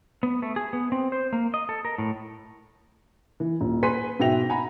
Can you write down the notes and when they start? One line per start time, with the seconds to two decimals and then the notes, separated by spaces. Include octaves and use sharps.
0.23 B3
0.42 A3
0.56 G#4
0.73 B3
0.92 C4
1.12 C5
1.33 A#3
1.54 D#5
1.69 A4
1.85 A#4
1.98 A2
3.40 E3
3.61 D#1
3.83 G#4 B4 G#5 C6 B6 D#7
4.20 G#2 B2 E5 G5 A#6 F7
4.49 F#5 G#5 A#5 B5